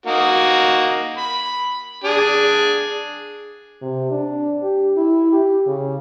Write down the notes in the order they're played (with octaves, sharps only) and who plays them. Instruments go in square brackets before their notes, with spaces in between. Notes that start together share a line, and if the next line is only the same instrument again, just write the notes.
[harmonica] A#3 D#4 F#4
B5
D4 G#4
[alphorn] C3
D4
G4
E4
G4
C#3